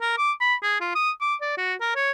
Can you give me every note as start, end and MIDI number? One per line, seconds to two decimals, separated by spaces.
0.01 0.14 70
0.17 0.32 86
0.40 0.55 83
0.63 0.77 68
0.80 0.94 65
0.95 1.11 87
1.21 1.34 86
1.41 1.55 74
1.57 1.74 66
1.81 1.91 70
1.95 2.11 73